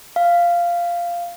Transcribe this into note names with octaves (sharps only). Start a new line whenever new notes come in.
F5